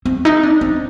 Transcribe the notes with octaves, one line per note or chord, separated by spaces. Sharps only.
C4
D#4
D4
C4